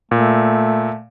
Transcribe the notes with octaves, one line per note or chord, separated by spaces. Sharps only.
A#2 A3